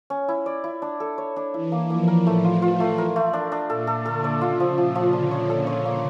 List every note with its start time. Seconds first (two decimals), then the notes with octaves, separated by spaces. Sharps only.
0.10 C#4
0.28 E4
0.46 D5
0.64 E4
0.82 D4
1.00 A4
1.18 C#5
1.36 D4
1.54 E3 E4
1.72 A#3
1.90 F3 A#3
2.08 A#4
2.26 A2 A3
2.45 F4
2.62 F4
2.80 A3
2.98 A#4
3.16 A3
3.33 D4
3.52 D4
3.70 A#2 A4
3.87 A4
4.06 D3 A4
4.24 D5
4.41 C#3 F4
4.60 F3
4.78 A#2 F3
4.95 F3
5.13 D3 D4
5.31 C#5
5.49 A4
5.67 C#5
5.85 A#3